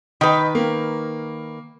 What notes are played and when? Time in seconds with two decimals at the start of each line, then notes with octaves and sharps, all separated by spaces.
0.21 D#3 B4 G5
0.55 A#3